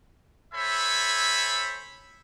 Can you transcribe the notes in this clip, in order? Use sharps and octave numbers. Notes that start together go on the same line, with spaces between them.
A4 C5 C#5 E5 G#5 B5